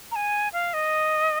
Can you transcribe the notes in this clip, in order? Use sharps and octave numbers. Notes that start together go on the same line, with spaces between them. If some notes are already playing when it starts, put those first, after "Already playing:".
A#5
G#5
F5
D#5